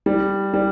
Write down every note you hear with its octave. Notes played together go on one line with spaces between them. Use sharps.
G3
G3